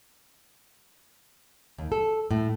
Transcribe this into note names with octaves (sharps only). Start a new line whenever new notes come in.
D#2
A4
A2